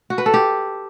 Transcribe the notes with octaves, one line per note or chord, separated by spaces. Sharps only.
F#4
B4
A4
G4